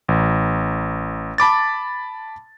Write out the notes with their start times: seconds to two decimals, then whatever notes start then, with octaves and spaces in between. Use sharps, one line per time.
0.08 A1
1.38 A5 B5 D6 A6